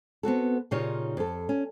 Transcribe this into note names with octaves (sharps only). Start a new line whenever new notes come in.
B3 C4 F#4 A4
A#2 C#3 D#4 F4 G4 C#5
F2 A4
C#4